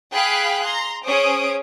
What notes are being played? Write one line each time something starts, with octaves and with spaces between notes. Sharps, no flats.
G#4 F5 G5 B5 F#6
A#5 C6
C#4 G#4 C5 C#5 D#6 D7